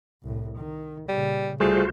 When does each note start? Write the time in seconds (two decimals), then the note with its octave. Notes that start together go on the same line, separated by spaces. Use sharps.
0.23 C2 A2
0.57 D#3
1.09 A#2 C#3 G3
1.60 C2 G3 A3 F4 F#4 G#4 C5